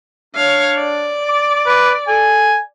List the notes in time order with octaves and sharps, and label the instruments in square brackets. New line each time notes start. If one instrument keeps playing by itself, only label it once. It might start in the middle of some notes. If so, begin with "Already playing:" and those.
[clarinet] D4 [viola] C#5 F5
[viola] D5
[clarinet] D6
[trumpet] B4
[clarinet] A4 [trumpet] G#5